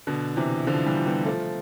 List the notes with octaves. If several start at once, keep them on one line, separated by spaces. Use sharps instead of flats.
B2 D3
C3 E3
D3 F3
E3 G3
G3 B3
F3 A3